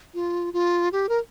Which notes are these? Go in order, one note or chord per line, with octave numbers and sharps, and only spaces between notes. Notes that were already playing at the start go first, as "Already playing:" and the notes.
F4
F4
G4
A#4